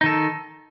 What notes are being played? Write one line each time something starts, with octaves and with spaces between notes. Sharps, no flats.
D#3 D#4 A4